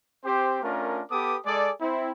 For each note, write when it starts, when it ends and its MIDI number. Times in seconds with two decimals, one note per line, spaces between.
0.25 0.62 60
0.25 0.62 67
0.25 0.62 72
0.63 1.01 57
0.63 1.01 61
0.63 1.01 62
0.63 1.01 65
0.63 1.01 70
1.11 1.36 59
1.11 1.36 67
1.11 1.36 69
1.11 1.36 71
1.11 1.36 86
1.11 1.36 87
1.46 1.71 56
1.46 1.71 68
1.46 1.71 69
1.46 1.71 74
1.81 2.12 60
1.81 2.12 64